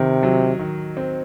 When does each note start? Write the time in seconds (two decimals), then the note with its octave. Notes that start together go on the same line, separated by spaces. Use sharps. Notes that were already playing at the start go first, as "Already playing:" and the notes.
Already playing: C3 D#3
0.23 F#3
0.59 D#3
0.97 C4